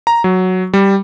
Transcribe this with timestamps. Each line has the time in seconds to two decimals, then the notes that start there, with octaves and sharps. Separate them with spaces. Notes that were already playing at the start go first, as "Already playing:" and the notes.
0.07 A#5
0.24 F#3
0.74 G3